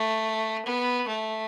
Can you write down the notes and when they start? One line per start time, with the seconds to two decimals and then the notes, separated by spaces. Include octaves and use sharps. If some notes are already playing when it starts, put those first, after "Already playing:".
Already playing: A3
0.65 B3
1.07 A3